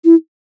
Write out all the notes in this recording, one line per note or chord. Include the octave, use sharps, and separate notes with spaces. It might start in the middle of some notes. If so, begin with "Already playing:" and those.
E4